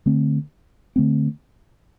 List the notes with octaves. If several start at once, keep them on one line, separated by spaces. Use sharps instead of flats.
D3 A3 C4
D3 A3 C4